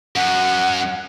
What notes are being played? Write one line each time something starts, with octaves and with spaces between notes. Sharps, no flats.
F#2 F#5